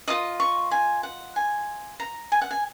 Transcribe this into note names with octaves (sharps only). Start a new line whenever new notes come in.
F4 A#4 D#5 D#6
C#6
G#5
F#5
G#5
A#5
G#5
F#5
G#5